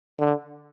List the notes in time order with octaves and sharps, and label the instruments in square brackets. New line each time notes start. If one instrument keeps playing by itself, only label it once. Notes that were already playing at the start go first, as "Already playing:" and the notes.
[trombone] D3